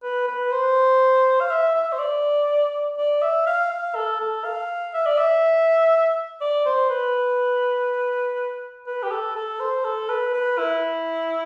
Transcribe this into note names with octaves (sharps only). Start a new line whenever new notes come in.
B4
B4
C5
F5
E5
E5
C5
D5
D5
E5
F5
F5
A4
A4
F5
E5
D5
E5
D5
C5
B4
B4
G4
A4
A4
C5
A4
B4
B4
E4